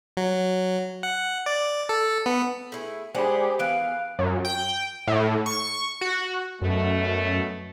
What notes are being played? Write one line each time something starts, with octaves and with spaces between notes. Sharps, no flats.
F#3
F#5
D5
A4
B3
A3 E4 G#4
G#3 D4 G4 G#4 C5 F#5 B5
E3 B3 F5 F#6 D7
F#2
G5
A2
C#6
F#4
F#2 B2 A3